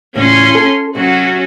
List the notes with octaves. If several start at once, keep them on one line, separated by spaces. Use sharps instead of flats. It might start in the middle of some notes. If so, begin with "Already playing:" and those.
E2 A2 C#3 C#4 F4 C6
A4
C3 F#3 C#4 F#4